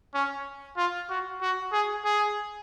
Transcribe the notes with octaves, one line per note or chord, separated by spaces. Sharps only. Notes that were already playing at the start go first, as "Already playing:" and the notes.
C#4
F4
F#4
F#4
G#4
G#4